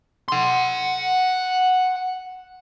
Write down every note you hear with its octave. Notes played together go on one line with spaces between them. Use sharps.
F#5 C6